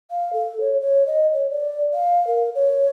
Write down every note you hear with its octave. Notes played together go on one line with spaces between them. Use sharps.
F5
A4
C#5
C#5
D#5
C#5
D5
F5
A#4
C#5